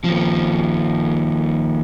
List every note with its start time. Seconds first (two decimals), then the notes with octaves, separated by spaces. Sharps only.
0.04 D#2 F3